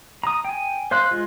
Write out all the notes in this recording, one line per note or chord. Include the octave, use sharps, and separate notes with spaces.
A#5 D#6
G5 G#5
C5 F5 C6 F#6
G#3 F4